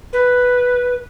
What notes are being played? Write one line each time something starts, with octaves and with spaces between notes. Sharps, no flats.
B4